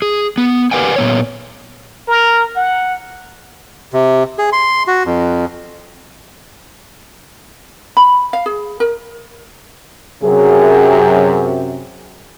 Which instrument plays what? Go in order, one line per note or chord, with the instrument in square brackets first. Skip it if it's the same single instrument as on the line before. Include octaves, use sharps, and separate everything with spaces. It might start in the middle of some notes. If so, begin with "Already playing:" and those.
[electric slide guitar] G#4
B3
G4 A#4 B4 F5 F#5 G#5
A#2 B3 C#5
[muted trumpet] A#4
F#5
[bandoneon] C3
G#4
C6
F#4
F2
[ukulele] B5
F5
G#4
A#4
[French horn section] F#2 C3 [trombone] G#4